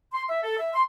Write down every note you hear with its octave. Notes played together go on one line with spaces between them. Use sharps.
C6
E5
A4
E5
C6